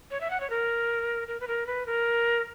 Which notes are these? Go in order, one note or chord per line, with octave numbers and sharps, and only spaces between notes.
C#5
E5
F#5
C#5
A#4
A#4
B4
A#4
B4
A#4